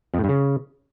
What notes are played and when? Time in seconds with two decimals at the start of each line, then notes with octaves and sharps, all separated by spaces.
0.14 F2
0.19 A2
0.24 G2
0.29 C#3